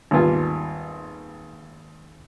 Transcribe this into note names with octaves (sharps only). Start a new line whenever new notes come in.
G#1 D#2 G3 B3 F4 G#5